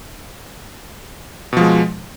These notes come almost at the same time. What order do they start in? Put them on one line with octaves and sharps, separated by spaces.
B2 F3 G#3